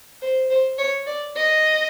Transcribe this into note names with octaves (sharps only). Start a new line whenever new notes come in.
C5
C5
C#5
D5
D#5